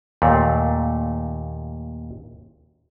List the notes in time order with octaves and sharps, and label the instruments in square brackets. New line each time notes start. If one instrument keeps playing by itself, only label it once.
[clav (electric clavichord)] D#2 A#2 A3